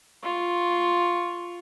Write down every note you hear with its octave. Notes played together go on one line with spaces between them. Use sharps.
F4 C#6